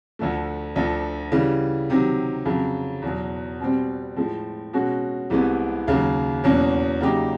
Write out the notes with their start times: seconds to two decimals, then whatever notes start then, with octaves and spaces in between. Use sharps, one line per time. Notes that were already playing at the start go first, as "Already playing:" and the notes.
0.19 D2 D3 F3 A3
0.76 D2 D3 F3 A3
1.32 C#3 E3 G3
1.90 C3 D#3 F#3
2.45 F2 C#3 F#3
3.02 E2 B2 F#3
3.60 B2 G3 C4
4.16 A2 F3 G#3
4.73 B2 G#3 C#4 F#4
5.30 C2 C3 E3 G#3 B3
5.87 D#2 C#3 F#3 A#3
6.44 E2 B2 F#3 A#3 C#4
7.01 C#3 F#3 A#3 D#4 G4